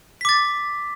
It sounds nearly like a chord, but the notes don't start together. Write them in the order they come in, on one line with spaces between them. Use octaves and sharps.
B6 D6 A6